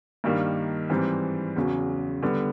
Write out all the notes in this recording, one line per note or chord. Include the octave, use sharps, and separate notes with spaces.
G2 D#3 G3 A#3
G#2 E3 G3 C4
E2 C#3 F#3
D3 G3 B3